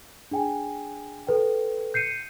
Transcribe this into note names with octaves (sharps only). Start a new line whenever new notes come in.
D4 G#4 G5 G#5
A4 B4 G5
G6 C7 C#7 D#7